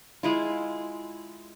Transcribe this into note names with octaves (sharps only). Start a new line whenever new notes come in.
G#3 E4 F4